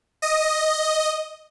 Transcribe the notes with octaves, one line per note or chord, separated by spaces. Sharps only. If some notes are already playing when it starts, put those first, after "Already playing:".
D#5